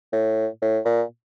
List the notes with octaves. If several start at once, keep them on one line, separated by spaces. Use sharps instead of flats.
A2
A2
A#2